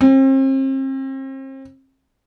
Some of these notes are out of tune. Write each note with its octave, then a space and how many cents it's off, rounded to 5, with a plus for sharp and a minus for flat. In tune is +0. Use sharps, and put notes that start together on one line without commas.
C4 +40